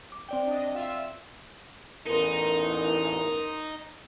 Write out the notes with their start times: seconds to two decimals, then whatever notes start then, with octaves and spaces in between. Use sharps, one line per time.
0.12 D6
0.29 C4 D5 G5
0.47 D4 D#5
0.75 F4 E5 E6
2.06 A1 E2 D#4 A#4 C6